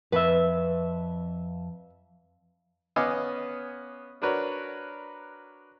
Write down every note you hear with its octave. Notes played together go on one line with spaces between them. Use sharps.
F2 B4 E5
B3 C#4 D#5 F5 G#5 D6
D4 F#4 A#4 B4 C#5